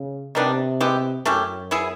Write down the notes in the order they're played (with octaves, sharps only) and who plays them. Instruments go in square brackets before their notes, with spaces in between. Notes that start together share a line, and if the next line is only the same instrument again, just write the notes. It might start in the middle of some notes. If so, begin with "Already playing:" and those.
Already playing: [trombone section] C#3
[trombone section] C3 [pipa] D#3 G3 B3 D4
[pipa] G#3 B3 E4 G4
[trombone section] F#2 [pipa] A3 C#4 E4 G4
[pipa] B3 E4 G#4